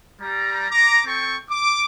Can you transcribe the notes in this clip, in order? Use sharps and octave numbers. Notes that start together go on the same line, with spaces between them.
G3 A#5
A#5 D6
C4 A4 G5 C#6
D6